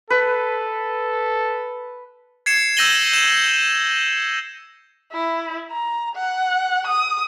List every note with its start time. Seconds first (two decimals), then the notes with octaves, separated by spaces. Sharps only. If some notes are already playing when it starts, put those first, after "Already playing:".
0.10 A4 B4
2.46 G#6 C7 C#7 E7
2.77 E6 G6 A#6 D#7 F#7 G7
3.13 G6 E7
5.12 E4
5.71 A#5
6.15 F#5
6.87 D#6